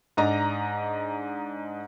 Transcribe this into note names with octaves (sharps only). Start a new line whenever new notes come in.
G#2 D4 D#5 A#5